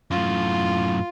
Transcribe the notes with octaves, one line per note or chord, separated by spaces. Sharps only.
F#2 A2 F4